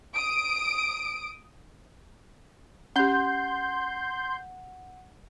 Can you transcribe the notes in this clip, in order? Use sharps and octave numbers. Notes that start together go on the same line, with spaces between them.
D#6 D7
C#4 G4 F#5 C6 G6